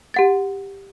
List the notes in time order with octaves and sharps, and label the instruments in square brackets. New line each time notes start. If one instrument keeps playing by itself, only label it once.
[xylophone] G4 F#5 A6